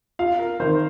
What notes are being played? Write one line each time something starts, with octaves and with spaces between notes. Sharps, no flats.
F4 F5
A#4
D#3 C5